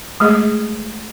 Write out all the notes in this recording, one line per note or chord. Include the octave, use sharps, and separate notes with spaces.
G#3 A3 G#4 D#5